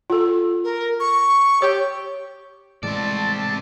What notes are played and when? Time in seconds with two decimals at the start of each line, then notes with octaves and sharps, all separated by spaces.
0.10 F4 A4
0.64 A#4
1.00 C#6
1.62 G4 C#5
2.83 A2 E3 G#3 C4 D5 A5